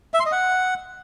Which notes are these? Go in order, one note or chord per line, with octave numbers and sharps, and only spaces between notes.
E5
C6
D#5
F#5